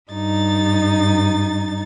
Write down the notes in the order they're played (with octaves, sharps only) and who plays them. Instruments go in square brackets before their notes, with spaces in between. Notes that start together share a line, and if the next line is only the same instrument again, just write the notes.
[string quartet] G2 D#4 A6